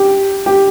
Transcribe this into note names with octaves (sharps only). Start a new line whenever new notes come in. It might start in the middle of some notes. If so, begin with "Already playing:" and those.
Already playing: G4
G4